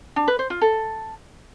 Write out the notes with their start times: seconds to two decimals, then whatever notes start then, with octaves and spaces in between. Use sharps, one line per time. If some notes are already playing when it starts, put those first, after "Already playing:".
0.16 D4
0.28 B4
0.39 C5
0.50 F4
0.62 A4